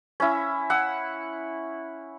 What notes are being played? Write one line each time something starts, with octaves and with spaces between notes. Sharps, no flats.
C#4 E4
F#5 E6